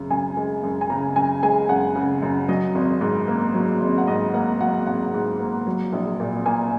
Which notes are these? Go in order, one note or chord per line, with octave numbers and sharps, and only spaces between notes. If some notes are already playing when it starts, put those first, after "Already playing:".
Already playing: F#2 C#3
F#2 G#5
G#3
F#2
G#5
C#3 A#5
F#2 G#5
G#3 G#5
F#2 F#5
C#3
F#2
F#3 D#5
G#1
G#2
A#3
F#3
G#1
F#5
G#2 D#5
A#3 F#5
F#3 F#5
G#1 F#5
G#2
A#3
F#3
A#1
A#2
A#3 G#5